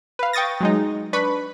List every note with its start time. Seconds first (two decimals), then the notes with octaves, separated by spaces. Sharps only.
0.19 B4 F5
0.33 G5 C#6 D#6 A6 A#6
0.60 F#3 G#3 D#4
1.13 D4 B4 B5 C#6